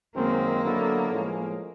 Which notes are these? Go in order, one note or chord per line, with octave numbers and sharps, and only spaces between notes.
F#2 D#3 G#3 A#3 C4
D3 F#3 B3 E4 A4
A2 F3 G#3 C#4